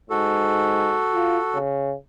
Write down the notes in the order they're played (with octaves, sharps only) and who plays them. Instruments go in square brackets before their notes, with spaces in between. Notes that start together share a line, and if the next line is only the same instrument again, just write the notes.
[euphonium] G#2 [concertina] F#4 A4
[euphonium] F4
C#3